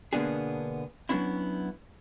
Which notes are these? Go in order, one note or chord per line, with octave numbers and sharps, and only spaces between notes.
B2 D3 A#3 B3 D4 G#4
F#3 A#3 B3 C#4 D4 E4